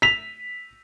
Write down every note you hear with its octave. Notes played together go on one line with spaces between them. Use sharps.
B6 F7